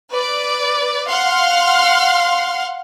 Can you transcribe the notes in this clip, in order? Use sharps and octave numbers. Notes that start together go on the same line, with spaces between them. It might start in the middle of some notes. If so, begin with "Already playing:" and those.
B4 D5
F5 F#5 C6 F6